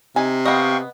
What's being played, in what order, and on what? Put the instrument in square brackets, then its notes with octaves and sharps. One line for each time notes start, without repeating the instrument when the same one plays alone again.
[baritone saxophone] C3 [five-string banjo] D#4 G#5
[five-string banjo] B3 D#5 [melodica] F5 G5 C#6